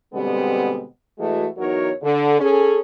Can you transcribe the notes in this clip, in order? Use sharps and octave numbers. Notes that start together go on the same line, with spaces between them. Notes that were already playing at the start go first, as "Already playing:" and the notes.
B2 D3 G3 G#3 B3 C4
E3 G#3 A3 F#4
E2 F#3 D#4 F#4 A#4 C#5
D3
C#4 G#4 A4